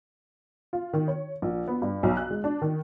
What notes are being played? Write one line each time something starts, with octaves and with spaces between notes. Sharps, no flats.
F4
D#3
C#5
A#1
B3
G2
B1
F#6
G#3
D4
D#3